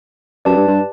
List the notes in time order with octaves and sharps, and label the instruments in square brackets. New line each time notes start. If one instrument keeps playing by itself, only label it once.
[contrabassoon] F#2 [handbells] G4 B4 D5 A5
[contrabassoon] G2
G2